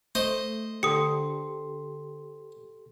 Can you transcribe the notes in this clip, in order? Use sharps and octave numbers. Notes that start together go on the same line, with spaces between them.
A3 C5 D#5
D3 G4 A4 C6 D#6 C#7